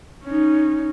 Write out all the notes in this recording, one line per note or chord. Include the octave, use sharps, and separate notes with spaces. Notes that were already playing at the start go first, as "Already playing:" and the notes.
C#4 D#4